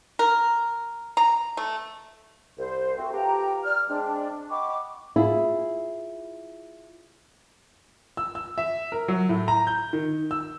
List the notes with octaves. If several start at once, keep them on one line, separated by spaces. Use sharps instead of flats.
A#4
A#5
A3
C2 C5
A3 C4 F#4
F4 G4 A4 B4 G5 A#5
D5 F6
G#3 C4 D4
D#5 F#5 G5 B5 C#6 D6
E4 F4 G#4
E6
E6
E5
A#4
F#3
A2
A#5
G6
D#3
E6